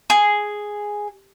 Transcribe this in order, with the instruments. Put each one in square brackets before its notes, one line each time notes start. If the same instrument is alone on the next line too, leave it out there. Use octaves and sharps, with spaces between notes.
[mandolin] G#4